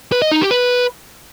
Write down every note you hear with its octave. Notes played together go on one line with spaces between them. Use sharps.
B4
D#5
D#4
G4
B4